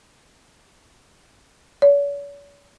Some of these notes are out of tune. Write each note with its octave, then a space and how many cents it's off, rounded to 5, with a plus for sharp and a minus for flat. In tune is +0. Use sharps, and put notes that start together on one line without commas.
C#5 +45